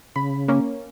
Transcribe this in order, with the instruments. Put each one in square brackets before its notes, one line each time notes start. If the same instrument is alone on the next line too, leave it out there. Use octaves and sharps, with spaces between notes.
[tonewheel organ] C#3 [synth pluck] B5
[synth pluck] A#3 C#4